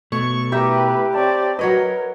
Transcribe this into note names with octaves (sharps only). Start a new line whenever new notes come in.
B2 A3 C#5 C#6
E4 G4 A#4 B4 E5
C4 C#5 D5 A5
F#3 A#4 B4 C#5 D#5